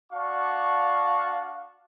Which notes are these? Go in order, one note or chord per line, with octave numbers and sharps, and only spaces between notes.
D4 F#4 D5 F5 A5 C#6